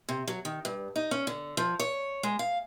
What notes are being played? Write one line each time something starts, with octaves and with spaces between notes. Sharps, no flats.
C3
F#3
D#3
G2
D#4
C#4
D3
F3
C#5
G#3
F5